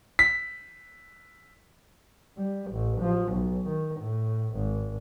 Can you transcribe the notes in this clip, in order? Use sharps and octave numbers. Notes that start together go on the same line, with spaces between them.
B6
G3
A1
F3
B1
D#3
A2
G#1